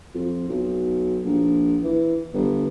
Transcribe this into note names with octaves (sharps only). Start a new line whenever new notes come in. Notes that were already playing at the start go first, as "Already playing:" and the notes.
F2
B1
A#1
E3
G1